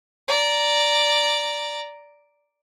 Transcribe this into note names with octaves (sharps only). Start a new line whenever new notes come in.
D5 A#5